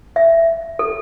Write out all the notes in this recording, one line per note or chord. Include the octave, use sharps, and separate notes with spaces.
E5
A4